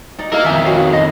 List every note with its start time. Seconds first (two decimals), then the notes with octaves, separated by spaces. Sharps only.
0.18 D#4 D5
0.32 E4 G#4 A#4 D#5 F5
0.45 F2 D#3 E5 G#5
0.65 F#4 C#5 F5
0.93 D#5